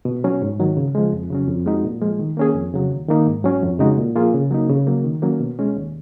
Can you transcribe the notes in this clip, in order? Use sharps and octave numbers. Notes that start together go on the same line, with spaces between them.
B2
F#3 C#4
G#2
D#3 F#3
C#3
F3 G#3
F2
C#3 F#3 C#4
F2
F3 G#3 D#4 F#4
A#2
F3 G#3
D#3
A#3 C#4 G#4
F2
C#3 F#3
D#2
D#3 A#3 D#4
G#2
F#3 C#4
F2
C#3 G#3 D#4 F#4
A#2
F3 A#3 F4 G#4
C#3
F#3 A#3 D#4
C#3
F#3 A#3
D#3
F#3 A#3 C#4
B2
G#3 C#4
D#2